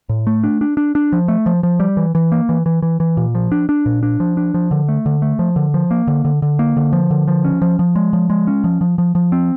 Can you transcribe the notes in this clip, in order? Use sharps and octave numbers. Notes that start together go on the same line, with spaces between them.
A2
A3
D4
D4
D4
D4
F3
A3
F3
F3
G3
E3
E3
A#3
E3
E3
E3
E3
A#2
F3
D4
D4
A#2
D4
F3
D4
F3
D3
A3
D3
A3
F3
D3
F3
A#3
D3
D3
D3
A#3
D3
F3
D3
F3
C#4
F3
F3
G#3
F3
G#3
C#4
F3
F3
F3
F3
C4